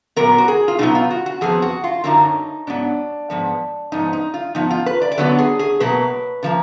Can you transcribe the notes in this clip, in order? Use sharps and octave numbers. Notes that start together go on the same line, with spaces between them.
A#2 F#3 B3 A#4
F#4
G#4
F4
B2 F#3 B3 D#4
F4
F#4
F#4
F2 F3 B3 G#4
F#4
F4
F#2 D3 F#3 A#3 D#4
G#2 F#3 B3 D4
G#2 F3 B3
G#2 F3 B3 D#4
D#4
F4
G#2 F3 B3 D#4
F4
B4
D5
D5
D3 F#3 B3 B4
G#4
G#4
B2 F#3 A#3 B4
D3 F3 A#3